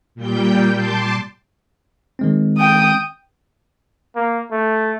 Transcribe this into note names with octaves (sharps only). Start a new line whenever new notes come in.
A#2 G3 G5 G6
A5 C6 D6
D#3 G#3 C4
G5 D#6
A#3
A3